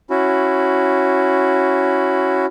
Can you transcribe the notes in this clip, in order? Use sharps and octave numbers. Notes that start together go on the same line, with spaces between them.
C#4 E4 F#4